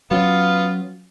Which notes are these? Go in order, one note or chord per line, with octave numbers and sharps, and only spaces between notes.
F#3 B3 C#4 F4